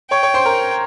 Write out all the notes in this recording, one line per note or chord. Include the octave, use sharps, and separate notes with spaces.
C#5 G5 C#6
C#5 C#6
C5 C6
A#4 A#5